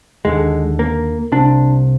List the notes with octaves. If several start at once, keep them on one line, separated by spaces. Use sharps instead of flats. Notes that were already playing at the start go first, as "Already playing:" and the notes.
D#2 D3 G#3
A#3
C2 C3 D4